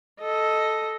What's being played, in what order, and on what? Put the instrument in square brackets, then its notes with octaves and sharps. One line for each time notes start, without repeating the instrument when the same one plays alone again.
[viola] A4 D#5